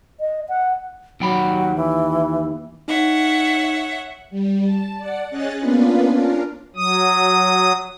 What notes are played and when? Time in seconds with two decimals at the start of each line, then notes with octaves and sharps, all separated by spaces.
0.20 D#5
0.49 F#5
1.20 D#2 F#3 G5 B5
1.76 E3
2.88 D#4 C#5 E5 F#5
4.30 G3
4.65 A5
4.97 D5 F#5
5.30 C#4 G#4 C#5 D#5 F#6 A6
5.60 A#3 B3 C#4 D4 F4 B4
6.11 C#4 D4 F4 A#4
6.76 F#3 D#6